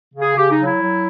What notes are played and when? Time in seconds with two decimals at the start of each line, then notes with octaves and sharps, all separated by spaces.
0.14 C#3
0.22 G#4
0.36 C#3 G4
0.51 D#4
0.58 F#3
0.65 E4
0.80 F#3